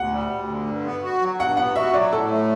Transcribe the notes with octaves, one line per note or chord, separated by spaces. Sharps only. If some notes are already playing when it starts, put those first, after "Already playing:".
Already playing: D2 F#5
G3
D2
D3
G2
B3
F#4
F#3
G2 F#5
B3 F#5
F#4 E5
F#3 D5
A2 A4
A3